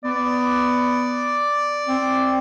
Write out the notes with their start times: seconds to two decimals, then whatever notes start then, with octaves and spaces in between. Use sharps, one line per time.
0.04 B3 D5
1.87 C4